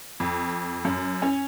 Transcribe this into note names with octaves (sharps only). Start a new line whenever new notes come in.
F2
F#2
C#4